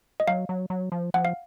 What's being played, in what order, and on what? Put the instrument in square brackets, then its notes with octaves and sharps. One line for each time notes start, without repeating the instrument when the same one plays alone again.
[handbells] D#5
[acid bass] F#3 [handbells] F5
[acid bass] F#3
F#3
F3
[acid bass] F3 [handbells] F#5
[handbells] F5